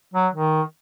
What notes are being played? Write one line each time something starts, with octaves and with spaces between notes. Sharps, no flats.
F#3
D#3